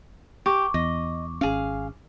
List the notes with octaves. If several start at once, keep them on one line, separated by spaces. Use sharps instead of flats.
G4 C#6 D6
E2 D#5
G#1 C#4 G#4 F5